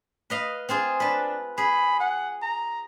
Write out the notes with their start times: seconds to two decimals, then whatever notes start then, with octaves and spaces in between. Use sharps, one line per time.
0.30 B4 D#5 F5
0.69 C4 F4 G#4
1.00 D4 B4 A5
1.58 G#4 B5
2.00 F#5
2.42 A#5